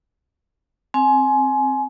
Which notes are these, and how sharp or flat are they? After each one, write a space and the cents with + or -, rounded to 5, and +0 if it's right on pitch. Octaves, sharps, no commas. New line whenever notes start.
C4 +10 G#5 +25